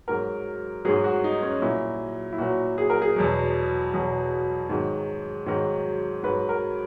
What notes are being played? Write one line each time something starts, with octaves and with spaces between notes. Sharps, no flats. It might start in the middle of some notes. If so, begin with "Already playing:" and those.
G#2 F#3 A#4
G#2 F#3 G#4
F#4
D#4
C#4
A#2 F#3 E4
E4
A#2 F#3 F#4
G#4
A#4
G#4
E2 B2 F#3
E2 B2 F#3
G#2 D#3 F#3
G#2 D#3 F#3
G#2 F#3 B4
A#4